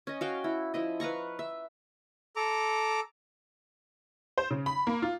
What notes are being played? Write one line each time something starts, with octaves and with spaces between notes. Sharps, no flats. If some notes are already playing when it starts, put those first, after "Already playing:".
C#4 D#5
F#4 F5 G5
E4
F3 E4 D#5
B4 F5 A#5 C#6
E5
A4 A#5 D6
C5
C#3
B5
A#3
F4